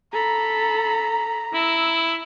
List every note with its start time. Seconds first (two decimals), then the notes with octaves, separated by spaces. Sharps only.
0.13 A4 A#5 B5
1.53 E4 E6